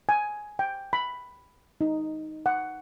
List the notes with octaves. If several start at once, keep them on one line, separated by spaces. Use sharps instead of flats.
G#5
G5
B5
D#4
F#5